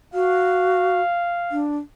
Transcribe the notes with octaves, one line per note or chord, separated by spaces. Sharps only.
F#4 F5
D4